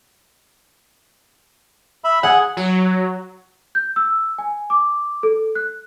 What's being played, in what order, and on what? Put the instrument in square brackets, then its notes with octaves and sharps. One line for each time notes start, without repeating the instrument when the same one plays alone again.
[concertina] E5 B5
[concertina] G#4 G#5 [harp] F#5
[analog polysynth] F#3
[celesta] G6
E6
G#5
D6
A4
F#6